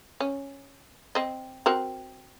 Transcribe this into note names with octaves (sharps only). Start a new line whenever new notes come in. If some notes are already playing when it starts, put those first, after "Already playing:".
C#4
C4 D#5
C4 F#4 A#4